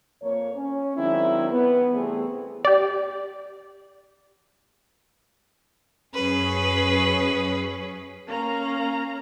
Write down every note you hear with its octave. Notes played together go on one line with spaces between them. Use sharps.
F2 A#3 C#5
C#4
D#3 F#3 G#3 C4 D4 E4
B3
C3 E3 G3 A3 C4 G#4
G4 D5
F#2 C#4 G#4 B4
A#3 C#4 F5 A#5